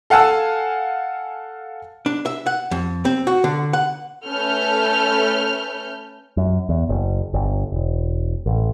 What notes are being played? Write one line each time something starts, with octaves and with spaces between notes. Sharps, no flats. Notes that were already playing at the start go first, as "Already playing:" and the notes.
A4 F5 F#5 G#5 A5 E6
D4
E5
F#5
F2
C4
F#4
D3
F#5
A3 C#4 A4 B4 F6 G6
F#2
E2
F#1
G1
E1
A1